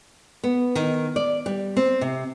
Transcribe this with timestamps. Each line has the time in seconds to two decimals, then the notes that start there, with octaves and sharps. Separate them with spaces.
0.44 B3
0.75 D#3
1.16 D5
1.46 G3
1.77 C4
2.01 C3